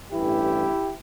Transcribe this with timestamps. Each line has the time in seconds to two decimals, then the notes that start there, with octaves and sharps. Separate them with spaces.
0.12 A1 G2 E3 E4 G4